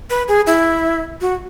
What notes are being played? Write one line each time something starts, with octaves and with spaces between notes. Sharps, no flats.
B4
G#4
E4
F#4